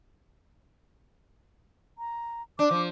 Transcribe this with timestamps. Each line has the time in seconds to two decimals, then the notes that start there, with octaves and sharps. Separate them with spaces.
1.98 A#5
2.59 D4 D6
2.71 F3